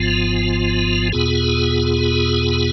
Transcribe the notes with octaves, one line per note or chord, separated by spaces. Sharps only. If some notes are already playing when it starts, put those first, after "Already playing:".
Already playing: G#1 G#2 F3 B3 F4
E2 B2 B3 F4 G#4